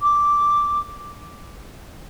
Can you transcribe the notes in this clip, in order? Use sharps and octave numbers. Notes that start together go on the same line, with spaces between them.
D6